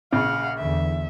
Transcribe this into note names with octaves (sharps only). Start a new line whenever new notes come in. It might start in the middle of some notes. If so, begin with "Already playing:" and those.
A#1 C#3 F5 F#5
E2 D3 E5